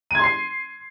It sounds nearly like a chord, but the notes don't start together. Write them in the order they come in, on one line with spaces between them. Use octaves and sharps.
D#7 G#6 C6 C7